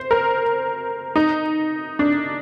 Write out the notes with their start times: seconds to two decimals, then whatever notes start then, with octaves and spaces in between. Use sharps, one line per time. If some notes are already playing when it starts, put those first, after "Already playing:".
Already playing: C5
0.11 A#4
1.16 D#4
1.99 D4